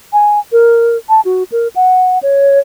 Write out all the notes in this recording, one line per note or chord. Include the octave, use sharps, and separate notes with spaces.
G#5
A#4
A5
F#4
A#4
F#5
C#5